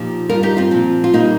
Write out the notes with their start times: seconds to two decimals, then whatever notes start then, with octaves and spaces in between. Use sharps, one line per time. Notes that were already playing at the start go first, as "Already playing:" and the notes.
Already playing: A#2 F3 D#4 G4
0.29 G2 G3 F4 A#4
0.43 D#4 G4
0.57 C4 F4
0.71 A#2 F3
1.04 F4
1.13 A#2 G3 A#3 D#4